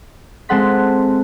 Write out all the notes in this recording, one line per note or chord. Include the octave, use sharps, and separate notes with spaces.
G#3 C4 A4 F#5 C6 B6